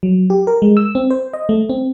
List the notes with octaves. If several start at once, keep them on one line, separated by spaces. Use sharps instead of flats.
F#3
G4
A#4
G#3
E6
C4
C5
D#5
A3
C4